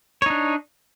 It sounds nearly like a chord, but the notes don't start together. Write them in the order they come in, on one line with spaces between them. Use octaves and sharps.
C#5 D#4 D4